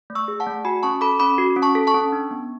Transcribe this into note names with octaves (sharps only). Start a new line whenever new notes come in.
A3
C#6 E6
G#4
F#5 A5
A3
F#4 G#5 B5
C#4 A5 C#6
A4 B5 D6
C#4 B5 D6
F#4
C#4
A5 C#6
A4
A5 C#6
C#4
D4
B3